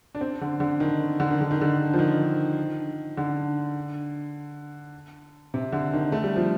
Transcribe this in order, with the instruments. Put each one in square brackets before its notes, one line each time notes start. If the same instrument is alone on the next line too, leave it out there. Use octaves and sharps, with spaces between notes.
[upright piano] D4
C4
D3
D3
D#3
D3
D#3
D3
D#3
D3
F3
D#3
D3
C3
D3
D#3
A3
G3
F3